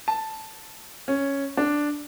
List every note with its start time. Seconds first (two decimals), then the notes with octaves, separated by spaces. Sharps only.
0.08 A5
1.08 C#4
1.57 D4